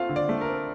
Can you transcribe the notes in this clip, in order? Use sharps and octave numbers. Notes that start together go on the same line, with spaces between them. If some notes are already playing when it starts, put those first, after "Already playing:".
Already playing: A3 C4 F4 F5
D3
D5
A3
A#4
C4